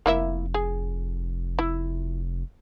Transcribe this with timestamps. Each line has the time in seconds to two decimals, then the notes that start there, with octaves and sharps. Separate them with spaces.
0.06 F1 A#3 E4 E5
0.54 G#4
1.59 E4